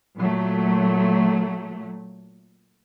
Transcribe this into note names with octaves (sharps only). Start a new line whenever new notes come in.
A#2 F#3 A3